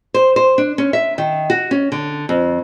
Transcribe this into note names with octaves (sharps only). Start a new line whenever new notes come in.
C5
C5
D4
C#4
E5
D#3
F#4
C#4
D3
F2